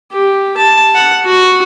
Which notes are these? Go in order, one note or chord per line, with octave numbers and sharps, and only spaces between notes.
G4
A5
F#5
F#4